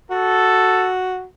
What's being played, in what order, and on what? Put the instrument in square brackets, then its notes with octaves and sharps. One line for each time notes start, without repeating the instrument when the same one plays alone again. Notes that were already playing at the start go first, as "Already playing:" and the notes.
[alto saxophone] F#4 [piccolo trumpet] A4